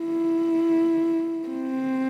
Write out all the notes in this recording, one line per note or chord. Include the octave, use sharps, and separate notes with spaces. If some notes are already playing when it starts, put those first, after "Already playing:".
Already playing: E4
C4